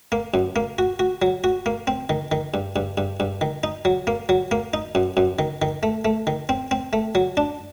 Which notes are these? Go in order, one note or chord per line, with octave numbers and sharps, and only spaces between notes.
A#3
F#2
A#3
F#4
F#4
F#3
F#4
A#3
C4
D#3
D#3
G2
G2
G2
G2
D#3
D#4
F#3
A#3
F#3
A#3
D#4
F#2
F#2
D#3
D#3
A3
A3
D#3
C4
C4
A3
F#3
D4